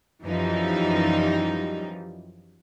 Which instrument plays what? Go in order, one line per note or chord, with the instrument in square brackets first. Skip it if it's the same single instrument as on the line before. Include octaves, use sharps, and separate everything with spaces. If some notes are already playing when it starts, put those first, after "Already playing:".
[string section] F#2 E3 F3 G3 D#4